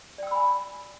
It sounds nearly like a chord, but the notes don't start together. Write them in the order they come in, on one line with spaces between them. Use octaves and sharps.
D5 G5 E6 B5 G#5